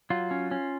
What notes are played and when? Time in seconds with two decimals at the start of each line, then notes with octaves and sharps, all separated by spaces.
0.10 F#3 F4
0.31 C#4
0.51 C#4